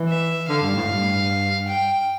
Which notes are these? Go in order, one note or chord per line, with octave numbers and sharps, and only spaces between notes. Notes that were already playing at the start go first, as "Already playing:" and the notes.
Already playing: E3
E5
D3 F5
G2
A2
G2
G5